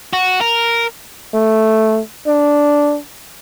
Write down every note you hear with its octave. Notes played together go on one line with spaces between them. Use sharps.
F#4
A#4
A3
D4